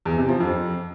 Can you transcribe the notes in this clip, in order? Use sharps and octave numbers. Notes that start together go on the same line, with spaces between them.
E2
C3
F3
F2